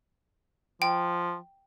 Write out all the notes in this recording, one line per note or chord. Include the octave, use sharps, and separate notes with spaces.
F3 G5